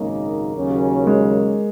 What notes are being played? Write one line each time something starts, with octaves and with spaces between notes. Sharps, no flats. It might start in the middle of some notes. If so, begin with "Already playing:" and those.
Already playing: G#1 F#2 C#3 G#3 A#3 D#4
D#2 C#3 F#3 C#4
G#3